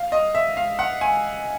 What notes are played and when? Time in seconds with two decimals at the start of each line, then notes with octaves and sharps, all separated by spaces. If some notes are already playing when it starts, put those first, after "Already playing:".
Already playing: F5
0.12 D#5
0.35 E5
0.57 F5
0.79 F#5
1.01 G#5